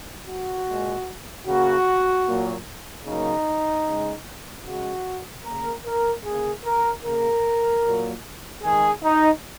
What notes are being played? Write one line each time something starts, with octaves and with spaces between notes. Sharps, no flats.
F#4
A#2 G#3
C#3 A#3 F#4
A#2 F#3 A#3
C#3 F#3 A#3 D#4
C#3 G#3
C#3 G#3 F#4
C#3 A#3 A#4
A#4
C#3 A#3 G#4
A#4
C#3 A#3 A#4
A#2 F#3 A#3
D#3 G#3 G#4
D#4